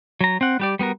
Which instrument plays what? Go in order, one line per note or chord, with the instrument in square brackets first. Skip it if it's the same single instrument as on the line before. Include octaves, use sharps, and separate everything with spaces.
[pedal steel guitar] F#3 A#5
C4 F#5
G3 G4 D5
G3 B3 F#4 A#4